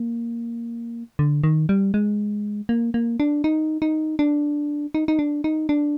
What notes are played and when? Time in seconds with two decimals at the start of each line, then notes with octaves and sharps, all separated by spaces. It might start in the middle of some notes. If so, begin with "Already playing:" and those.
Already playing: A#3
1.19 D3
1.44 D#3
1.69 G3
1.94 G#3
2.69 A#3
2.94 A#3
3.20 D4
3.44 D#4
3.82 D#4
4.19 D4
4.94 D#4
5.08 D#4
5.19 D4
5.44 D#4
5.69 D4